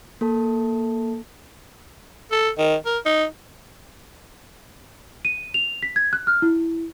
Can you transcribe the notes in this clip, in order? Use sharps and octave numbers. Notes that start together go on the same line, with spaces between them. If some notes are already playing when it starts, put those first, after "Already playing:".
A#3 A4 A5
A4
D#3
A#4
D#4
D#7
F7
B6
G#6
F#6
F6
E4